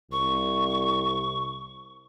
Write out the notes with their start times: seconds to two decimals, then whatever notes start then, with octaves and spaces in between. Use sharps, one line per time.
0.12 C2 C#6